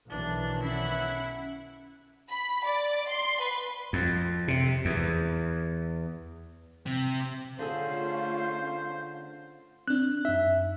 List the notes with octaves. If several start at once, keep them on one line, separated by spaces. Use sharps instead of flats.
B1 D#3 E3 D4
C#4 E4 F#5
B5
D5
C6
B4
F2
C3
E2
C3
D3 A3 C#4 F4 G#4 A4 C5 F5
C4 D4 F#6
F#2 D#4 E5